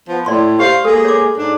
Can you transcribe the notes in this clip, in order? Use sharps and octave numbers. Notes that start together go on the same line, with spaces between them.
F3 B3
A2 D5 C6
G4 C5 F5
G#3 A#3 G#4 A4
C#5 D6
G#2 D4